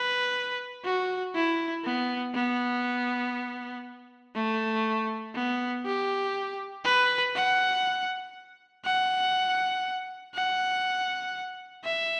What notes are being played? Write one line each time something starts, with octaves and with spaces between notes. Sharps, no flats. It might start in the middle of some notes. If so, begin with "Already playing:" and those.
Already playing: B4
F#4
E4
B3
B3
A3
B3
G4
B4
F#5
F#5
F#5
E5